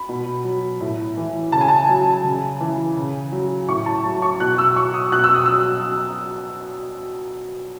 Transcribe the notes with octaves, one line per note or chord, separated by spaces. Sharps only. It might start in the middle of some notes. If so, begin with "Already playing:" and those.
Already playing: B5
B2
F#3
A2
E3
C#3 A5
G#5
A5
F#3
C#3
E3
C#3
F#3
A2 C#6
A5
F#3
C#6
B2 F#6
E6
F#3 C#6
D#6
B2 F#6
E6
D#6
F#3 E6